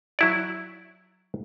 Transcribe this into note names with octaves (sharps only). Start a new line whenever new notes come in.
F#3 E4 D5